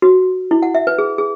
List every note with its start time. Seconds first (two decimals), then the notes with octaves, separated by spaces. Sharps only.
0.02 F#4
0.51 E4
0.62 F#5
0.75 E5
0.87 B4
0.98 G#4
1.18 G#4